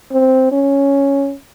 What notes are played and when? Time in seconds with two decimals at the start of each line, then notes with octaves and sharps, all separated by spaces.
0.12 C4
0.52 C#4